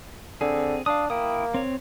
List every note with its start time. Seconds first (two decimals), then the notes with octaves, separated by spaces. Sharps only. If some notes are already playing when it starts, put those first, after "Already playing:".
0.41 D3 C4 G#4
0.86 D4 F5 D#6
1.10 A#3 E4 G5 D#6
1.54 C4 C#5